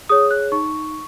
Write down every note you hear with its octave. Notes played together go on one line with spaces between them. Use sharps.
G#4 C#5 D#6
F#6
D#4 C#6